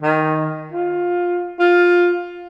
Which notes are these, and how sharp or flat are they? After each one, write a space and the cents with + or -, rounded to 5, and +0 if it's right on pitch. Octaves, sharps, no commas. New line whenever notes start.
D#3 +5
F4 +15
F4 +15